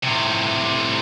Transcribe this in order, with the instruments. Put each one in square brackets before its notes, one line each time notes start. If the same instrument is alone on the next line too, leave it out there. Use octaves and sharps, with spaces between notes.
[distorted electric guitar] A2 C3